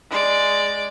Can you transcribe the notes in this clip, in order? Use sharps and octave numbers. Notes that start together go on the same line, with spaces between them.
G#3 D5